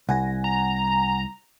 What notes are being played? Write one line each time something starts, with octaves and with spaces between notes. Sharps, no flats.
C2 F#5 G#5 A#6
A#5